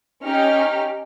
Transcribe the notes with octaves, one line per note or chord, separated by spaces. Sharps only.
C#4 D#4 G4 F6